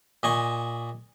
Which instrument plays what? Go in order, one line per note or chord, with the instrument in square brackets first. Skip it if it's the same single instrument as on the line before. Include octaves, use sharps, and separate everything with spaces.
[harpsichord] A#2 D#5 G#5 C#6